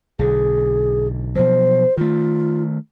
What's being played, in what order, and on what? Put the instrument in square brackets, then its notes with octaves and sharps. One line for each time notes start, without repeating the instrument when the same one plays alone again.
[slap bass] B1 D3 [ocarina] G#4
[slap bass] B2 F3 F#3 [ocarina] C5
[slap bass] D#3 A3 [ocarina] F4